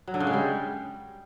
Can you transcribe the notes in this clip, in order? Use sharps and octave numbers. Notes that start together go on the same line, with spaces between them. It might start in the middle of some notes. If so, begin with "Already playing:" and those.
F#3
D3
C#3
G#3
G3